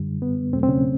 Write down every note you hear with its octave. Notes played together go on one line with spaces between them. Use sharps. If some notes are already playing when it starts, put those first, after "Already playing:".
Already playing: F#2 D3 G3
B3
E2 B2 F#3 A3 C4
C4
C#3 C#4